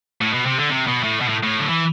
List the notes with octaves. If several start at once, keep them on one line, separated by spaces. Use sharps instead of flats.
A2
B2
C3
D3
C3
B2
A2
B2
A2
A2
D3
E3